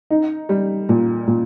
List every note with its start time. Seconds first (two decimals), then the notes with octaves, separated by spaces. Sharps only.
0.11 D#4
0.49 G3
0.89 A#2
1.27 A#2